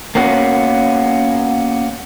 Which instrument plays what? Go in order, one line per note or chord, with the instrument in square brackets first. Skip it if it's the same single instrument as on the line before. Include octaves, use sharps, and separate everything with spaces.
[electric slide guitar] A#3 B3 C#4 F#4